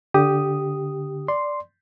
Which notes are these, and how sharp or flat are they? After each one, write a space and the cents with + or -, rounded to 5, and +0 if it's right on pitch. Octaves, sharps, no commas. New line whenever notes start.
D3 -10 G4 +0 D#6 +0
D5 +0 C6 +0